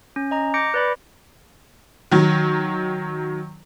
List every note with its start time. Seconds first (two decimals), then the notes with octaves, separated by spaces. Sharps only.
0.16 C#4
0.31 D#5 A#5
0.54 D6 G6 A#6 C#7 D7
0.74 B4 D5 B5
2.11 D#3 F#3